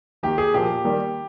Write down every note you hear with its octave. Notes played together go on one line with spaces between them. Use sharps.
D#3 A#3 G4
G#4
A#2 F3 A#3 G4
D#3 G3 A#3